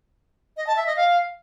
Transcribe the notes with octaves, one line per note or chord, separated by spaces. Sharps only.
D#5
A5
E5
D#5
F5